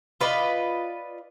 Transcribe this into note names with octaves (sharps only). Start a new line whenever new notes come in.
F4 B4 D5 D#5